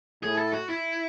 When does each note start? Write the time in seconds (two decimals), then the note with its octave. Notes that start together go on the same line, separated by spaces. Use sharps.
0.23 A2 G#4
0.38 A4
0.53 F#4
0.69 E4